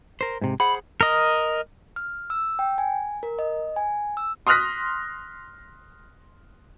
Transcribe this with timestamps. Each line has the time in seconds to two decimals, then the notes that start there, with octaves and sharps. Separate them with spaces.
0.21 A#4 C5
0.41 G#2 C3
0.60 G#4 C5 F#5 B5
1.01 A#4 D#5
1.96 F6
2.30 E6
2.59 G5
2.78 G#5
3.23 A#4
3.39 D#5
3.76 G#5
4.17 E6
4.47 C6 D#6 F6 F#6 A#6 B6